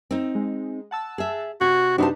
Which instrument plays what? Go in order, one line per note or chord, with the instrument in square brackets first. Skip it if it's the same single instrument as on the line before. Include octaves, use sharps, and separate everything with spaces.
[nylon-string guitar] C4 D#4
[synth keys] G#3
F#5 A5 E6
[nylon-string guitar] G#4 E5
[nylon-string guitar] C3 [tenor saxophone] F#4 [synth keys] G#6
[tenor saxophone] C3 [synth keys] D4 D#4 B4 [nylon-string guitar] F#4 C5 A5